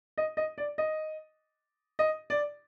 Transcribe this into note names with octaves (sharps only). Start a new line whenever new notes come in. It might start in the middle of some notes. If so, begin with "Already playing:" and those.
D#5
D#5
D5
D#5
D#5
D5